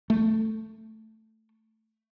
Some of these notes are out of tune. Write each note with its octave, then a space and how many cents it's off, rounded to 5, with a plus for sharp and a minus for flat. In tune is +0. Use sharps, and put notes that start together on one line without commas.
A3 +5